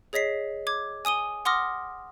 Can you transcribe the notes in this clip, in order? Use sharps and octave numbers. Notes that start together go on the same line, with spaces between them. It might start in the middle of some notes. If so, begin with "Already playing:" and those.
G#4 C#5 D#5 B6 C7
D6 G#6
G#5 D#6 D#7 G7
F#5 C6 D6 D#6 F6 A#6